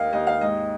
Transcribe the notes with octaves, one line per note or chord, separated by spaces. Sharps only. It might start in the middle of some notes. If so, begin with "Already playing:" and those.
Already playing: D#2 A#3 D#5 F5
D#2 D#5
F5
G#2 D#5